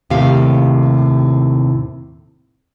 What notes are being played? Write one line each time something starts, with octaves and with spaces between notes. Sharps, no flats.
D#2 A2 C3 G4 F5